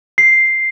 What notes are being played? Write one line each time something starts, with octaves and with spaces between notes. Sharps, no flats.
C7